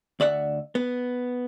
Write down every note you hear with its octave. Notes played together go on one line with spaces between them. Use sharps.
D2 D5 E5 F#5
B3